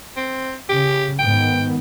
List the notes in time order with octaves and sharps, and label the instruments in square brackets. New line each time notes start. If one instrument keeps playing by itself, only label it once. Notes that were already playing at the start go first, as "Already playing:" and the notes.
[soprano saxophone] C4
[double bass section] C#3 [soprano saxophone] G4
[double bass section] G#2 D#3 B3 [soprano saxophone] G5